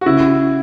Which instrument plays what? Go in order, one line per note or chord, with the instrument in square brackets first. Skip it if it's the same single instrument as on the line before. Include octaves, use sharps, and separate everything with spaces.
[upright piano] F#4
[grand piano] C#3 [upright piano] E4